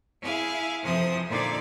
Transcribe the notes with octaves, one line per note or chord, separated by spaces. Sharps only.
E4 G#4 F5
F2 C3 E3 F3 C5 D#6
A#2 D3 D#4 D5 F5 G#6